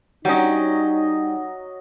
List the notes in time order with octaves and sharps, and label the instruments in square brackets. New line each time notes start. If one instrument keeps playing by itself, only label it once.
[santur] F#3 D#5 [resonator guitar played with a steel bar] G3 C#4 [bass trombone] D#4